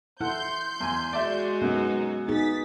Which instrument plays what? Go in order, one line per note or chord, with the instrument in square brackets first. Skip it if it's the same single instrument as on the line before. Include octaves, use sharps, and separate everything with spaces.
[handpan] E4 [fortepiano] A4 F#5 [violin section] C6 G6
[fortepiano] E2 G#5
[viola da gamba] G#3 F#4 [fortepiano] D5 E5
[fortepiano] F#2 [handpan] B3 [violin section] D#4
[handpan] B3 D#4 G#4 [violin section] A6 B6